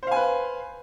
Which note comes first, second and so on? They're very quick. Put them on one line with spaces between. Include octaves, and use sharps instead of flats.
C5 F5 G#5 B4